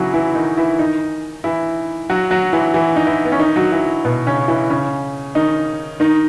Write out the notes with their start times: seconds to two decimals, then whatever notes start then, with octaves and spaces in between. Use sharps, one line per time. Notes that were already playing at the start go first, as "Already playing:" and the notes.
Already playing: C#3 E3 F#3 E4 F#4
0.14 E3 E4
0.35 D#3 D#4
0.57 E3 E4
0.79 D#3 D#4
1.44 E3 E4
2.10 F#3 F#4
2.31 F#3 F#4
2.53 E3 E4
2.74 E3 E4
2.96 D#4
3.07 E3 E4
3.25 B3
3.32 C#4
3.39 D#3 D#4
3.56 F#3 F#4
3.72 E3 E4
4.05 B2 B3
4.27 C#3 C#4
4.48 E3 E4
4.70 C#3 C#4
5.35 D#3 D#4
6.00 D#3 D#4